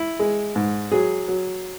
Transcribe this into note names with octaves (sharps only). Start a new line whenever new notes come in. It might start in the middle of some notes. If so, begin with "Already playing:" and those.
Already playing: E4
G#3
G#2
F#3 G#4
F#3